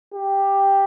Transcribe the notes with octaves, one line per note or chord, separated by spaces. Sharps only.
G4